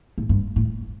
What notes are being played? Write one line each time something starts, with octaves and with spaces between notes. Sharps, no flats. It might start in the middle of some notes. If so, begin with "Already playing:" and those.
A2
G2
A2